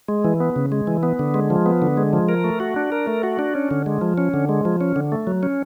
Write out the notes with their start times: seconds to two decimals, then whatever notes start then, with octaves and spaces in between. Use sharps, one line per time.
0.08 G#3
0.24 E3
0.40 B3
0.56 C#3
0.72 G#3
0.87 E3
1.03 B3
1.19 D3
1.34 G#3
1.50 F3
1.66 B3
1.82 D3
1.97 G#3
2.13 F3
2.29 A#4
2.44 A3
2.60 F#4
2.76 D4
2.92 A#4
3.07 A3
3.23 F#4
3.39 D4
3.55 C#4
3.71 D3
3.86 G#3
4.01 F3
4.18 C#4
4.34 D3
4.49 G#3
4.65 F3
4.81 C#4
4.96 D3
5.12 A3
5.27 F#3
5.43 C#4